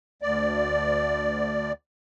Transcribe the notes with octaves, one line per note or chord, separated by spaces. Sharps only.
D2 D5